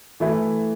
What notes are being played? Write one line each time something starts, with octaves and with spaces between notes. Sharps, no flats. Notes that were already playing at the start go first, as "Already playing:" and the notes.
E3 A3 E4